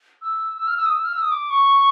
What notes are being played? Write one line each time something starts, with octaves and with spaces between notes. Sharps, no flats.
E6
E6
F6
E6
D#6
E6
F6
E6
D#6
D6
C#6